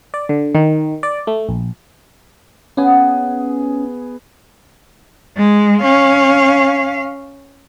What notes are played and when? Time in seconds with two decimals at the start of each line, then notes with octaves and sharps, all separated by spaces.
0.14 D5
0.29 D3
0.55 D#3
1.03 D5
1.27 A3
1.49 A#1
2.77 B3 C#4 G#4
5.37 G#3
5.81 C#4 F5